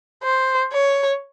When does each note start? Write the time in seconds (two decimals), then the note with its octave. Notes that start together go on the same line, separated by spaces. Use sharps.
0.24 C5
0.72 C#5